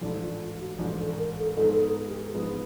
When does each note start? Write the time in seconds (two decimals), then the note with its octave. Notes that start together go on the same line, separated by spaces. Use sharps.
0.01 A1 G#2 F3 A3 D4 E4
0.22 F4
0.40 F4
0.60 F#4
0.79 A1 G#2 F3 A3 D4
0.98 A4
1.17 A#4
1.37 A4
1.57 G#2 F3 G#3 B3 D#4 A4
1.72 A4
1.82 G#4
2.08 G4
2.34 G#2 F3 G#3 B3 D#4 G#4